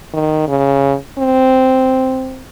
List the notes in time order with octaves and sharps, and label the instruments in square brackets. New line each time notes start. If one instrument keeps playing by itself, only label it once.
[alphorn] D#3
C#3
C4